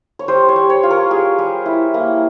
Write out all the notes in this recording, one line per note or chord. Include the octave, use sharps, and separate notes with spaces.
C#5
G3 C5
C#5
G3
C#5
F4
A#4
G3 G#4
G3
E4
A#3